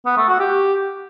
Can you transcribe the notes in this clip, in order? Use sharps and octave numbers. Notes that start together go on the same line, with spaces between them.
B3
A3
F#4
G4